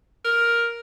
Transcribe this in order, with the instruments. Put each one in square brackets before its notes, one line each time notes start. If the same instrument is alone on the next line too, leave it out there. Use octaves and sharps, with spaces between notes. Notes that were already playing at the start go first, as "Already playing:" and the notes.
[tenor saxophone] A#4